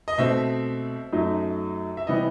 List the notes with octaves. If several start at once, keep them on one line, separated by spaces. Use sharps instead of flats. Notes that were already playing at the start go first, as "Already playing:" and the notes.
D#5
B2 A3 C4 E5
F#2 F#3 A3 D#4
E5
C3 E3 G3 B3 D#5